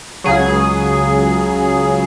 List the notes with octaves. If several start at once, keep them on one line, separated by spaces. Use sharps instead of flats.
C#2 C#3 F#3 G#4